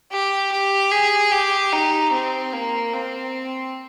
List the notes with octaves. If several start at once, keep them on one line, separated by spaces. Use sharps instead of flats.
G4
G4
G#4
G4
D#4
C4
A#3
C4